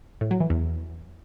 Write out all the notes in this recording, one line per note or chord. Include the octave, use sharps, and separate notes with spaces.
A2
F#3
E3
E2